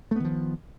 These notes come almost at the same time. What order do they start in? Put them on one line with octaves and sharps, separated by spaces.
A3 B3 D#3 F3